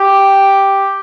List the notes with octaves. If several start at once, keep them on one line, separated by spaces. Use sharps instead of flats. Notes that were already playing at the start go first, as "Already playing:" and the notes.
Already playing: G4